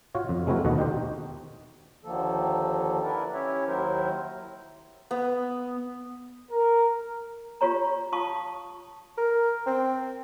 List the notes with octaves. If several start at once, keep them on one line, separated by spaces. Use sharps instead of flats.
F4 F#4 C#5
F2
G#3 A3 C4 E4 F#4 A#4
D#2 B2 D3 F#4 D#5 F#5
D#4 G4 C5
D#2 D3 D#3 F3 A#3 A4
E4 A#4 B4 D5
C#4 E4 G4 C#5 E5
D#2 D#3 F#3 E4 A#4 C5
B3
A#4
F4 G4 C#5 A#5
F4 F5 A5 C#6 D#6
A#4
C4